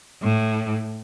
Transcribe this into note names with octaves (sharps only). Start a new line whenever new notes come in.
A2